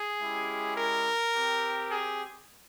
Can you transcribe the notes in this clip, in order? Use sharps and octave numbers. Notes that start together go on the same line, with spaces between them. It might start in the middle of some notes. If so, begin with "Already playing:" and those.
Already playing: G#4
G#3 C#4 E4 G4
A#4
C4 G4
G#4